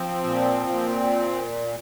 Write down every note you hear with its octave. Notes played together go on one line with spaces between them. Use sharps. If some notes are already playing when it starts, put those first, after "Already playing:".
Already playing: F3 C4
A#2
A#2